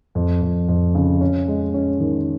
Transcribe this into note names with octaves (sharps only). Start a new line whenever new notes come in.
F2
F2
F2
C#3
C#4
G#3
C#4
D#3